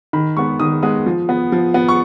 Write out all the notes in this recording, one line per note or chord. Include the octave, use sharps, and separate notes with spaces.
D#3 B5
G#3 B3 C#6
D#3 D#6
G#3 B3 D#6
F3
B3
F3
B3
C#6